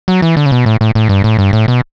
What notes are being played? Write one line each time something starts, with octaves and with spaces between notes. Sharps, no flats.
F#3
E3
D3
C#3
B2
A2
A2
A2
G2
A2
G2
A2
B2